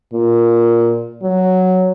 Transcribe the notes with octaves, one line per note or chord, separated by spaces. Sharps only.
A#2
F#3